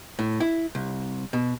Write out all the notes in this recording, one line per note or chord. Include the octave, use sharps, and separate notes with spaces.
A2
E4
C2
B2